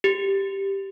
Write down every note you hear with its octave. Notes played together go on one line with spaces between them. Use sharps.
G4